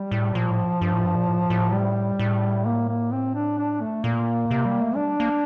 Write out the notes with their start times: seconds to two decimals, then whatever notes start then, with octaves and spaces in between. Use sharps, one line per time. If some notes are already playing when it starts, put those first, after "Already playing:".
Already playing: G3
0.11 A2
0.34 A#2 F3
0.50 A2
0.81 G2
0.92 A2
1.04 G2
1.16 A#2
1.27 A2
1.50 A2
1.73 G3
2.19 A2
2.66 A#3
2.88 A#3
3.12 C4
3.34 D4
3.58 D4
3.81 A3
4.04 A#2 A#3
4.51 C3
4.65 G3
4.81 A3
4.96 G3 D4
5.20 A#3